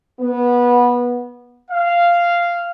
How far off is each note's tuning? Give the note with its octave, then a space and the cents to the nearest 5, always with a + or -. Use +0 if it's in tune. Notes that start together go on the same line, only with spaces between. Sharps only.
B3 -20
F5 -10